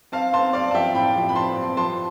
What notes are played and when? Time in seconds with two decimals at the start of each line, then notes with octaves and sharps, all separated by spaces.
0.12 C4 F5 A5
0.33 C4 A5 C6
0.53 C4 D5 F5
0.71 A5
0.75 F3 E5 G5
0.95 A2 G5 B5
1.16 F3
1.29 B5
1.35 F3 A5 C6
1.56 C4
1.77 F3 A5 C6